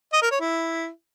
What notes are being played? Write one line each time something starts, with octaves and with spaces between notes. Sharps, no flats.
D#5
A#4
C#5
E4